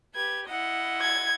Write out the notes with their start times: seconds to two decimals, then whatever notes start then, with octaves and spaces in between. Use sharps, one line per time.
0.15 G4 B4 G#6
0.48 E4 D#5 F#5
1.01 G#6